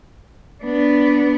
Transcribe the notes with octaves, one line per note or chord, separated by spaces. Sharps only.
B3 D4